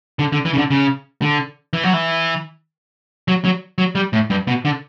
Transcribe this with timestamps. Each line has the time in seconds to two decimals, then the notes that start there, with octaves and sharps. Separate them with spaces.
0.19 D3
0.32 D3
0.45 E3
0.53 C#3
0.58 D3
0.70 C#3
1.22 D3
1.73 E3
1.84 F#3
1.93 E3
3.28 F#3
3.45 F#3
3.78 F#3
3.95 G3
4.13 A2
4.30 G2
4.47 B2
4.65 D3